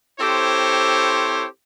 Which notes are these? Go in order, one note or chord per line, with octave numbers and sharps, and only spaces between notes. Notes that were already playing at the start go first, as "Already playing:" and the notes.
C4 E4 G4 A4 C5 C#5